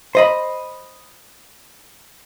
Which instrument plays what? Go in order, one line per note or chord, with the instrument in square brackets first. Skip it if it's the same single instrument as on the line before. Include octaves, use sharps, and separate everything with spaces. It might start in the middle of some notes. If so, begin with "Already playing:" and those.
[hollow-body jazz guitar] C5 D#5 B5